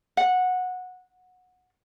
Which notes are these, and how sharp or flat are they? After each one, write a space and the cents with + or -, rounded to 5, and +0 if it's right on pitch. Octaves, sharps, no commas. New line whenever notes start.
F#5 -15